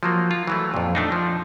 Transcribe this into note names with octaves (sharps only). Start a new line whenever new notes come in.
F3 F#3 A#3
F4
E3 F#3 A3
F2 A#2
A3 D4 D#4
F3